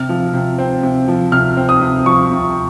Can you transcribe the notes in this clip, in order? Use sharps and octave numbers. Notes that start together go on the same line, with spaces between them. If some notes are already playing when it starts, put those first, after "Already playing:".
Already playing: C3 F6
F3
C3
C4
C3
F3
C3 F6
C4
D#6
C3
F3 C#6
C3